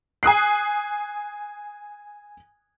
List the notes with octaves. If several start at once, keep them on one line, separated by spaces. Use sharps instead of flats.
G#5 D#6 F#6 C7